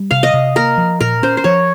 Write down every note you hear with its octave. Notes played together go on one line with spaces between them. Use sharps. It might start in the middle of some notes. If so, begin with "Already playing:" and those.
Already playing: G3
C3 F5
D#5
C3
A#3 A#4
F3
A#2 A#4
C#4 C5
C5
F3 C#5